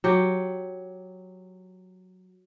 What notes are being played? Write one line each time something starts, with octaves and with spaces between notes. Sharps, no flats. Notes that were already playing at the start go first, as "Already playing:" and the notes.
F#3 G4